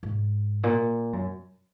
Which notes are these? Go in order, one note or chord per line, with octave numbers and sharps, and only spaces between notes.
G#2
A#2
F#2